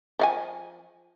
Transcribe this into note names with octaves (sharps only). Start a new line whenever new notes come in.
F3 F5 G#5